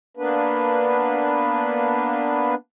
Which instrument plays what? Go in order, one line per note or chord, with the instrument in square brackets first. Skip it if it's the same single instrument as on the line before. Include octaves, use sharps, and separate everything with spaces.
[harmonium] A#3 B3 D4 B4